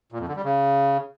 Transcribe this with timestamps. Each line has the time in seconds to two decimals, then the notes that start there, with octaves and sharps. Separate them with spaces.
0.12 A#2
0.20 F2
0.28 D3
0.36 G3
0.44 C#3